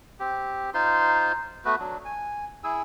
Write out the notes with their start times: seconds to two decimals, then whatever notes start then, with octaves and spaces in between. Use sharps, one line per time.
0.20 C4 G4
0.74 D#4 F4 C5 C6
1.65 A3 B3 F#4 B4
1.80 F#3 D4
2.05 G#5
2.64 E4 G#4 G#5 E6